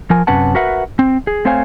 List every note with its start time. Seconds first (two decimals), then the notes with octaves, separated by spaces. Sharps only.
0.10 F3 A#4 G#5
0.27 F#2 C3 C#4 B4 F#5 A5
0.55 F#4 A#4 B4 E5 F#5
0.99 C4
1.27 G#4
1.45 A3 C4 C5 C#5 F5 G#5